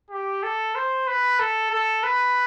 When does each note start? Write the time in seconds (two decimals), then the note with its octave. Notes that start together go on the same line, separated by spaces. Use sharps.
0.10 G4
0.43 A4
0.75 C5
1.07 B4
1.39 A4
1.71 A4
2.03 B4